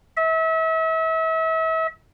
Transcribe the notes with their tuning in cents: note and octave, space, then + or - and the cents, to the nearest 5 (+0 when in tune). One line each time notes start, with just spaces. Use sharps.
E5 -35